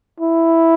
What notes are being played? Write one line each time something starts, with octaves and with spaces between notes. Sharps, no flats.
E4